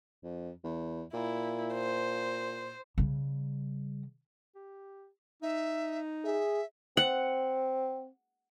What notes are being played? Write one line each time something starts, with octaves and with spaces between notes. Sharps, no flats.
F2
E2
A#2 E4
C5
C#3 G3
G4
D#4 E5
G#4 E5
C4 F#5